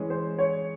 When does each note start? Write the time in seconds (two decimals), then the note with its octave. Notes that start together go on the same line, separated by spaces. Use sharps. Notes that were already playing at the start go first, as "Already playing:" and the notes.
Already playing: E3 G#3 C#4
0.10 C5
0.38 C#5